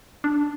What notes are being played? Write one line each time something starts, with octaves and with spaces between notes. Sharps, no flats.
D4